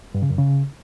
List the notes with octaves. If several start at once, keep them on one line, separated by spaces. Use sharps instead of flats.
G2
C#3
F#2
C#3